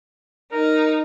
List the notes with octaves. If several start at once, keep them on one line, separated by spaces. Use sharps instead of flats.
D#4 A#4